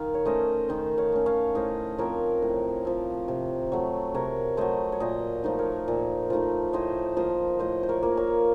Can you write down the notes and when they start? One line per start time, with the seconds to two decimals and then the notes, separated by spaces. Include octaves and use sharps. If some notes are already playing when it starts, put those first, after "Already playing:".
Already playing: D#3 F5
0.14 C#5
0.25 A3 C#4 C5 D#5
0.69 D#3 C5 D#5
0.98 C#5 F5
1.12 A3 C#4
1.26 C#5 F5
1.55 A2 C5 D#5
1.98 F3 C4 A#4 C#5
2.42 A2
2.85 F3 C4
3.28 C3
3.72 F#3 A3
4.15 C3 A#4 C#5
4.57 F#3 A3 C5 D#5
4.92 C#5
5.00 A#2 C5 D#5
5.44 F3 A3 D#4
5.59 A#4 C#5
5.88 A#2
6.30 F3 A3 D#4
6.73 A2 C5 D#5
7.17 F3 A#3 C5 D#5
7.59 A2 C5 D#5
7.83 C5
7.89 A#4 C#5
8.03 F3 A#3
8.17 A#4 C#5